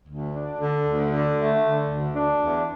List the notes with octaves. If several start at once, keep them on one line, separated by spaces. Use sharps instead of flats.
D2
D4
D3
D2
D3
A3
D3
D2
D4
E2